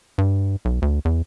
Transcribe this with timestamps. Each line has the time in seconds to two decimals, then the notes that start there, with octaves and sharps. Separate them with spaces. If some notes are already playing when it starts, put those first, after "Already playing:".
0.18 G2
0.65 B1
0.82 D2
1.05 E2